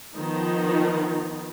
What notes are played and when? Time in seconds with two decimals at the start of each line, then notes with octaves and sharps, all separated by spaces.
0.16 D#3 F3 B3 D#4